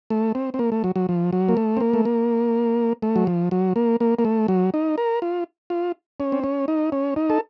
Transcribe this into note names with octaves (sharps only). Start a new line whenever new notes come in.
A3
C4
C4
A#3
A3
F#3
F#3
F3
F#3
A#3
A3
C4
A#3
A3
A#3
A3
F#3
F3
F#3
A#3
A#3
A#3
A3
F#3
D#4
A#4
F4
F4
C#4
C4
C#4
D#4
C#4
D#4
A4